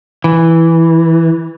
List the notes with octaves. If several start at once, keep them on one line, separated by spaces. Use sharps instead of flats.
E3